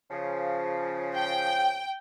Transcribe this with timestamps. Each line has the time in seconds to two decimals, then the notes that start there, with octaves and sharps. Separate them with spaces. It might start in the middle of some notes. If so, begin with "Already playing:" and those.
0.11 C#3 F3
1.16 G5